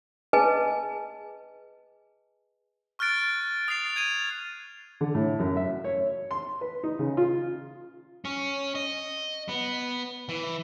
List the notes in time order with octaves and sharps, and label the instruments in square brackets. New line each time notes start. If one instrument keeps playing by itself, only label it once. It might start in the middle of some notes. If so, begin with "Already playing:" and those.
[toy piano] G#4 B4 D#5 G#5 A5
[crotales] C#6 F6 F#6 A6 D7
D#6 A6 C7 F7
G#6 D#7 F7
[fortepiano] D3
A2
F#2
E5
C#5
C6
B4
D#4
C#3
F4
[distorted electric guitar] C#4
D#5
B3
E3